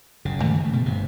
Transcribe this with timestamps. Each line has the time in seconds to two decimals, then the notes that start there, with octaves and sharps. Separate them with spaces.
0.25 F#1 C#3
0.43 G2 D#3 E3 A3
0.60 C#3 A3
0.73 B2 A3
0.86 G1 G2 C3